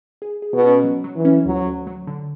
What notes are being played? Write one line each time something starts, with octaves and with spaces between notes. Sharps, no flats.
G#4
G#4
B2
C#4
F#3
F#3
E3
C#4
D2 F#3
D2
F#3
D3